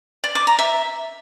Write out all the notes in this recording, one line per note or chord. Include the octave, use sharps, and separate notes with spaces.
D5
D6
A#5
E5